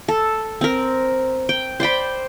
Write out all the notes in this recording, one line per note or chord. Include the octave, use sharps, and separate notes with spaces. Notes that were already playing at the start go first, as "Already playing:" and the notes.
A4
C4 A#4
G5
C5 D5 G5 B5